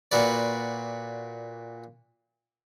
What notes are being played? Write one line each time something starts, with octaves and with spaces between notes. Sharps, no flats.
A#2 F#4 B4 D5